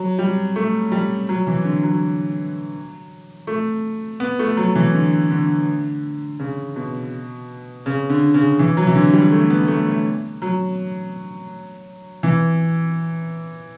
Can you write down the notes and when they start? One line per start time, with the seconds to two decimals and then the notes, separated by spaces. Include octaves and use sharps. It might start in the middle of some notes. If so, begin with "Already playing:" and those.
Already playing: F#3
0.18 G3
0.56 A3
0.92 G3
1.29 F#3
1.47 E3
1.64 D3
1.83 F#3
3.47 A3
4.20 B3
4.39 A3
4.57 F#3
4.75 E3
4.94 D3
5.31 D3
6.40 C#3
6.76 B2
7.86 C#3
8.10 D3
8.34 C#3
8.59 E3
8.77 F#3
8.87 E3
8.95 D3
9.13 G3
9.32 A3
9.50 B3
9.68 A3
9.87 A3
10.42 F#3
12.23 E3